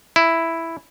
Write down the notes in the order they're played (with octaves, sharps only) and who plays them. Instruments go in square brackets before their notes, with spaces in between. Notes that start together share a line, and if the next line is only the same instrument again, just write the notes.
[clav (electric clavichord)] E4